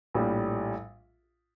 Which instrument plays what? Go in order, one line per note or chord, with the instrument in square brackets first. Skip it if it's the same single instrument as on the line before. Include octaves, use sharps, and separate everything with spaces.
[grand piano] A#1 A2 G3